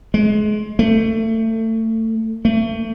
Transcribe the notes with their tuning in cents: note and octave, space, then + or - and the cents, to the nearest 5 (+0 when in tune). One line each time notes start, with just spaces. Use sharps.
G#3 +30
A3 +25
A3 +35